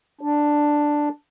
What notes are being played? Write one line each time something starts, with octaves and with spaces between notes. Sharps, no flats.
D4